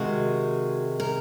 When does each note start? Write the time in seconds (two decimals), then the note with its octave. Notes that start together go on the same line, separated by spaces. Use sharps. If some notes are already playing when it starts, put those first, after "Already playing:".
Already playing: C3 D#3 G#3 F#4
1.00 A#4